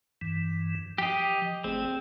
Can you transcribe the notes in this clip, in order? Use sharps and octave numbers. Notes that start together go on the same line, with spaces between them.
G2 E3
F3 G4 D#5
G1 A3 C4 G#4